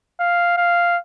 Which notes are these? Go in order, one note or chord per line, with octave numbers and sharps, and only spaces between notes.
F5
F5